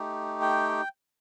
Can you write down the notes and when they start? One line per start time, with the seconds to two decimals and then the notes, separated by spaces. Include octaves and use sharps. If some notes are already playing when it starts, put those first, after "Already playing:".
Already playing: A3 D#4 G4
0.42 G5